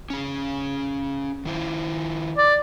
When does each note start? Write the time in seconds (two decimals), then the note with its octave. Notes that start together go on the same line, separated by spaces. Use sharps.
0.10 C#4 G#4
1.45 D#3 E4 C5
2.37 D5